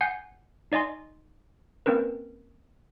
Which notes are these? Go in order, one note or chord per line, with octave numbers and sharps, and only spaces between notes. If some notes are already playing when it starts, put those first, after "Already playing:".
F#5 G#5 G6 C7
D#4 D5 D#5 G#5 C6
A#3 C4 C#4 A#4 B4